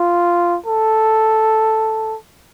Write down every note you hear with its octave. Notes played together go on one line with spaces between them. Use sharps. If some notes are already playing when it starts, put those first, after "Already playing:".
Already playing: F4
A4